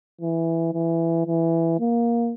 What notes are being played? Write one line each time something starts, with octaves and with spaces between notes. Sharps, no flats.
E3
E3
E3
A#3